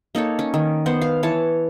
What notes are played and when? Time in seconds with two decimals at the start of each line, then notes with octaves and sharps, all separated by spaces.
0.15 A#3 D#4 A4 C#5
0.39 C#4
0.54 D#3
0.86 B3 C5 F#5
1.01 F5
1.23 E3 C#5 A5